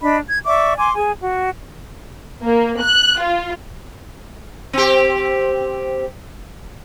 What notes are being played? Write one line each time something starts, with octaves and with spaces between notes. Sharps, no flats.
D4 D#5 B5
G#6
D5 E5 C#6 D6
G#5 C6 D6
G#4 G#5
F#4
A#3
F#6
F4
C4 G4